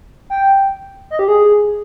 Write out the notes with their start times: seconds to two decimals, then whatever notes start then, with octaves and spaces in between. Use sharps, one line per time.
0.30 G5
1.10 D#5
1.19 G4
1.28 G#4